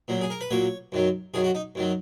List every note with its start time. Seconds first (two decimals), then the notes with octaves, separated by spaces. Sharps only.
0.08 A#2 F#3 A#3
0.21 G#4
0.30 A#4
0.41 B4
0.51 A#2 F#3 A#3 C#5
0.92 F#2 D#3 F#3
1.34 F#2 D#3 F#3 G#4
1.44 F#4
1.55 D#4
1.75 F#2 D#3 F#3